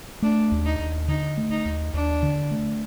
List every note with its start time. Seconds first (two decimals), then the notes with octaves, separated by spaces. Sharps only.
0.22 A3 D4
0.52 D#2
0.66 D#4
0.79 D#2
1.08 D3 D#4
1.37 A3
1.51 D#4
1.65 D#2
1.94 D#2 D4
2.23 D3
2.51 A3